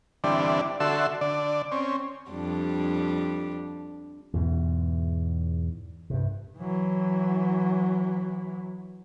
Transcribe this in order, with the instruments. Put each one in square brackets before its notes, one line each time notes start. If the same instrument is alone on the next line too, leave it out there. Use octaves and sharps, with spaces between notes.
[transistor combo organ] D3 E3 G3 C4 D4
D3 F#4 A4 E5 C6
D3 D5
C4 C#4
[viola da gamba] F2 G3 D4
[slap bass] E2 G#2 B2
G2 C3
[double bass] E3 F#3